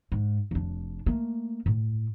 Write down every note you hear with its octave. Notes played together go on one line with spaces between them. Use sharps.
G#2
F1 D4
A3 A#3
A2